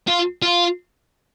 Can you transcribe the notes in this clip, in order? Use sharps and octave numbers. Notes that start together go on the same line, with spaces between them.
F4
F4